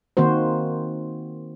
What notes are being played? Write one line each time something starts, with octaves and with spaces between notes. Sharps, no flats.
D#3 A#3 C4 F#4 C5